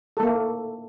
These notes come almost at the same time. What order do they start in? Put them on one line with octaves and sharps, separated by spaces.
A4 A3 A#3